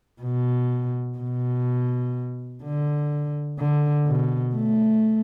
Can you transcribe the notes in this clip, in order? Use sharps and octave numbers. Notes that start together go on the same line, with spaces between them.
B2
B2
D3
D3
B2
A3